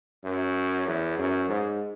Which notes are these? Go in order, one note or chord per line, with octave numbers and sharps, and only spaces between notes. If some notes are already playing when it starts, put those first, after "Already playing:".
F#2
E2
F#2
G#2